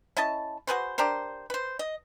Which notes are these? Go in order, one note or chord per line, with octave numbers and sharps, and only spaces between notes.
C#4 E4 D#5 A5
F#4 G#4 B4 C5
D4 G4 A#4 C5
B4 C5
D#5